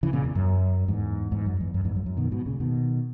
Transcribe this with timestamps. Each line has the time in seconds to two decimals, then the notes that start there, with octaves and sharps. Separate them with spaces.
0.03 C#3 E3
0.13 A#2 C#3
0.24 E2
0.35 F#2
0.88 E2 G#2
1.31 E2 G#2
1.46 F#2
1.61 E2
1.74 F#2
1.85 E2 G#2
1.96 F#2
2.06 F#2
2.17 B2 D#3
2.32 G#2 B2
2.46 A#2 C#3
2.60 B2 D#3